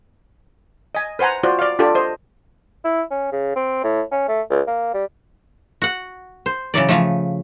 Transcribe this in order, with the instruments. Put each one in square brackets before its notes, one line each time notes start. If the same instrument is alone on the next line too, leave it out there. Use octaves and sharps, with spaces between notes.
[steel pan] D#5 G#5
B4 C5 F#5 G#5 A#5
F4 F#4 C5 D5
D5 F5
D4 F4 G4 A4 D5
C5 D#5
[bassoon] E4
C#4
C#3
C4
A2
C#4
A3
C#2
A#3
G3
[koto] F#4 F#5
C5
C#3 E3 F#3 D5
C#3 F3 A3